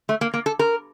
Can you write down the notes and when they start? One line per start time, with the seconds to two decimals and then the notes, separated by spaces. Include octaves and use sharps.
0.09 A3
0.21 A#3
0.34 A#3
0.46 A4
0.59 A#4